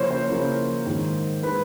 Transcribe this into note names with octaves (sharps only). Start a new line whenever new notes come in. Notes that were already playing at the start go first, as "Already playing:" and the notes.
Already playing: C#3 F3 A#3 C#4 E4 A#4 C5 C#5
C5
C#3 F3 A#3 C#4 E4
G#2 D#3 G#3
D#3 G#3 B4